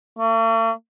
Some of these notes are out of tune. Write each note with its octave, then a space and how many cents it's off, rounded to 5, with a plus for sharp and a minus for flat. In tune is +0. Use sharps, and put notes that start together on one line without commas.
A3 +45